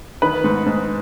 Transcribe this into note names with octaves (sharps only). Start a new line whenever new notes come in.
D#3 B4
G#2
G#2